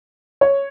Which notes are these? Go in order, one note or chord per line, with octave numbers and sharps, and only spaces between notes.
C#5